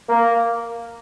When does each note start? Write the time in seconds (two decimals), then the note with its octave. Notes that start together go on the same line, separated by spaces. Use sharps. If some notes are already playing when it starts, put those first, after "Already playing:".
0.09 A#3